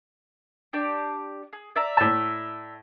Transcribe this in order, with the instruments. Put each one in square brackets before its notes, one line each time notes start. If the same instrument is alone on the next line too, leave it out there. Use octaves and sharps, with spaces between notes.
[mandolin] D4 G4 D5
G#4
D5 E5 A#5
[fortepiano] A2 A5